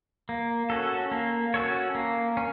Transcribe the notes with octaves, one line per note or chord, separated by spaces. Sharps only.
A#3
C#4 F#4 A4
A#3
C#4 F#4 A4 C#5
A#3
C#4